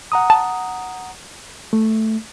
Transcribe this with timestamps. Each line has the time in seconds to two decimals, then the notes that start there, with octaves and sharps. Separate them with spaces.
0.12 F#5 A#5 D#6
0.30 A5
1.73 A3